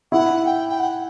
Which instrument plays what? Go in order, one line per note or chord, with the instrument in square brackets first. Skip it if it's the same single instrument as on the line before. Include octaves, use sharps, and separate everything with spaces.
[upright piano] E4 [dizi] F#5
[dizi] G5
G5
F#5